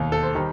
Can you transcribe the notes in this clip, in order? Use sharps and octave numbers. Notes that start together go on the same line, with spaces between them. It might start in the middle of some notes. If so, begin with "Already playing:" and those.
Already playing: E1 D#2 D#3
A4
C5
D#3 G3